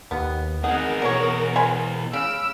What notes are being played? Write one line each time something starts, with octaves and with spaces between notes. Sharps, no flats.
D#2 B3
B3 C4 D#4 G#4 A#4 F#5
B2 E3 F#3 C#5
C5 G#5 B5
C#3 B5 E6 F6 D7